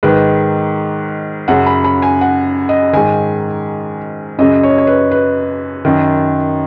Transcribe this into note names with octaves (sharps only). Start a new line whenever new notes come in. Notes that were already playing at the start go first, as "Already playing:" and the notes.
G#2 D#3 B4
F#2 C#3 F#5
B5
B5
G#5
F#5
D#5
G#2 D#3 G#5
F#2 C#3 D#5
C#5
D#5
C#5
B4
B4
F#2 D#3